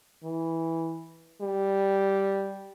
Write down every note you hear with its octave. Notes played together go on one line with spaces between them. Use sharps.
E3
G3